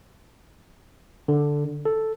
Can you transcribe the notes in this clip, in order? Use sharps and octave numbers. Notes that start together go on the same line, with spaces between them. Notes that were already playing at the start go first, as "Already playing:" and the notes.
D3
A4